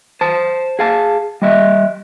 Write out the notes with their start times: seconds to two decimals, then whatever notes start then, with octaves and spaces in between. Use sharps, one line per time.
0.21 C5 A5
0.79 G#4 F5 A5
1.42 G3 D#5 E5